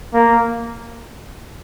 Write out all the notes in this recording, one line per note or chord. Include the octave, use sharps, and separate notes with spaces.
A#3